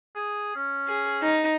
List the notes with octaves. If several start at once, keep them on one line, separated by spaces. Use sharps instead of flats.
G#4
C#4
G#4
D#4